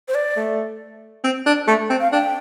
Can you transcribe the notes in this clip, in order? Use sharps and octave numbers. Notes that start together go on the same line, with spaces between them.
C5
D5
A3
C4
D4
A3
C4
F5
D4 G5